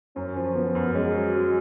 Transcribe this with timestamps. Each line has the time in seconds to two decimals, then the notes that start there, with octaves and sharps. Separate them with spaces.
0.16 F#2 C#4
0.36 F3
0.56 F3 B3
0.75 F#2
0.95 G#3 C#4
1.15 F#3
1.35 F#3